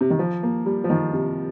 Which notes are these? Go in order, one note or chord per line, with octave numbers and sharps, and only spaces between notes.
C3
D#3
F3
A#3
G3
F3
D#3
C3